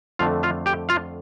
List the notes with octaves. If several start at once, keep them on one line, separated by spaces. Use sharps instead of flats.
F2 D3 A3 F4 F5
F4 F5
G4 G5
F4 F5